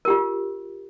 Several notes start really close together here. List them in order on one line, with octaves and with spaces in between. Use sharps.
A#4 G4 F4